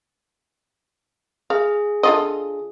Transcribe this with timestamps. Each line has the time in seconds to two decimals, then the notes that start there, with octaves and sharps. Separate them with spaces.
1.50 G#4 F5
2.03 D3 F4 D#5